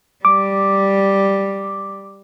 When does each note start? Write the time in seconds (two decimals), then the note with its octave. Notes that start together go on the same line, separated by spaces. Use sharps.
0.25 G3 D6